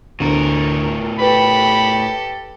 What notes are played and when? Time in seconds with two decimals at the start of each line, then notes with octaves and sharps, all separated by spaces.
0.20 D2 A2 A#4
1.19 G4 A4 B4 B5